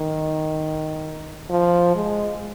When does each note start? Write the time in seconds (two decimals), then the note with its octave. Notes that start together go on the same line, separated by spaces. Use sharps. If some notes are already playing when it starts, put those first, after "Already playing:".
Already playing: D#3
1.50 F3
1.95 G#3